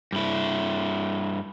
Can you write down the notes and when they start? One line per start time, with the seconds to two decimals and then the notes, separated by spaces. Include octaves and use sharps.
0.13 G2 E4